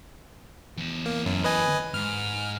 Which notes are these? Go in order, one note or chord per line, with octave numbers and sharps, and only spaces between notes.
E2 A5
A#3
F#2
B4 D#5 G#5
G#2 F6